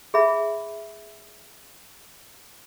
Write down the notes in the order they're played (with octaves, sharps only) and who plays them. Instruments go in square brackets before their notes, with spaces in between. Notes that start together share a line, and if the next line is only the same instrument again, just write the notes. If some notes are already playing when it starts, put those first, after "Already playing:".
[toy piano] G#4 E5 B5